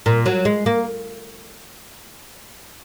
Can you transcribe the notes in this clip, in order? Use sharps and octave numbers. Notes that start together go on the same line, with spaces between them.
A#2
F#3
G#3
A#3